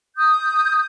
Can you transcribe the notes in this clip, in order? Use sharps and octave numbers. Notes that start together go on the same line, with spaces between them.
D#6 G6